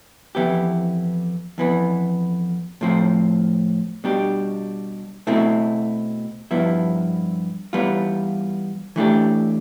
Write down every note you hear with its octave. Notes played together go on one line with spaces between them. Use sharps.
F2 E3 B3 E4 G4
F2 E3 B3
A2 F3 C4
B2 G3 D4 G4
B2 A3 C4 E4
G2 F3 B3 E4
E3 G3 B3 F4
E3 A3 D4 G4